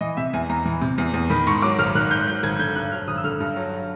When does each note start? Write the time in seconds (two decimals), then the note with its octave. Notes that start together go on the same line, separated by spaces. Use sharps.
0.01 E3 D#5
0.17 C3 E5
0.33 E2 G#5
0.49 E2 A#5
0.65 E3
0.81 C3
0.98 E2
1.14 E2
1.30 D#3 B5
1.46 G#2 C#6
1.62 F#3 D6
1.79 G#1 F6
1.95 D#3 F#6
2.11 G#2 G6
2.20 F#6
2.27 F#3 G6
2.43 G#1 G#6
2.59 D3 G6
2.75 G2 F#6
2.91 F#3 F6
3.08 G#1 D#6
3.17 E6
3.24 D3 F6
3.40 G2
3.56 F#3